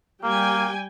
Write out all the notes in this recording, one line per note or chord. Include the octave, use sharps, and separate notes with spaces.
G3 A#3 G5 G#5